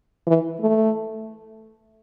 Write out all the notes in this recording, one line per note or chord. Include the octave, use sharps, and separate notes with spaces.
E3
A3